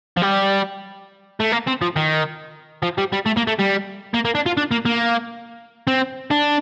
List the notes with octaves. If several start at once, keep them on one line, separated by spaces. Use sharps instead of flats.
F3
G3
A3
A#3
C4
F3
D#3
F3
G3
G3
A3
A#3
A3
G3
A#3
A#3
D4
F4
D4
A#3
A#3
C4
D4